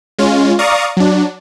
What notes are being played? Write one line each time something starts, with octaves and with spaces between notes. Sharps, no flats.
G#3 C#4 F4
D5 F5 A#5 C#6 D#6
F#3 D4